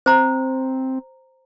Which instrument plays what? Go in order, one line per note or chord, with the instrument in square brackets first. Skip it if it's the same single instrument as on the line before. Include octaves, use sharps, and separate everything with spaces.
[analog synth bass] C4 [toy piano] C5 A#5